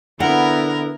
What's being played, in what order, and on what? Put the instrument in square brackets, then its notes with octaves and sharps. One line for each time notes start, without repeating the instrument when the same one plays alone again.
[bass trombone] D3 [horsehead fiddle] B3 E4 [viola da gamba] A#4 [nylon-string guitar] F#5